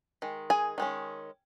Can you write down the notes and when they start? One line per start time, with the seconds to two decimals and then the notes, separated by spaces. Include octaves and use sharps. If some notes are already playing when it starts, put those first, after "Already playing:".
0.22 D#3 G#3
0.50 G#4 G#5
0.78 D#3 G#3 C#4